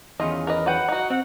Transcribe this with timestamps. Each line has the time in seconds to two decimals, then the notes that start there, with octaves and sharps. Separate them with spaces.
0.20 E2 D#3 C#4 F4 D#5
0.47 A#4 B4 D#5
0.66 F#3 B4 F#5 G5
0.89 D#4 F#4
1.10 C4 F#5